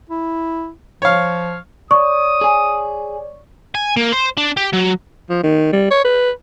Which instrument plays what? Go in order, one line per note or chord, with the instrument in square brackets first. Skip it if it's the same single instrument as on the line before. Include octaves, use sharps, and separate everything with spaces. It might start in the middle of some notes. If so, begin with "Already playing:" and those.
[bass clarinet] E4
[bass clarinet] F3 [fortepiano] C#5 F5
[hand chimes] C#5 D5 [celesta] C#6 [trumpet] D#6
[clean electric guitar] G#4 G#5
[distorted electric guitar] G#5
A#3
C5
D4
G4
F#3
[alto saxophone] F3
D#3
G3
C#5
B4